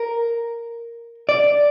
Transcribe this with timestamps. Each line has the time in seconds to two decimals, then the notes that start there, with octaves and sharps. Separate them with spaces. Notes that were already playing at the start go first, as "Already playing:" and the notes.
Already playing: A#4
1.29 D5